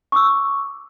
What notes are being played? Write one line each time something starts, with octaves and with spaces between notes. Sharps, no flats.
C#6 D6 E6